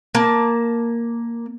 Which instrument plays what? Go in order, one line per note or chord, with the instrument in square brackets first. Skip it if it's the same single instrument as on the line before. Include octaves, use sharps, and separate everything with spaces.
[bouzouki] A#3 A5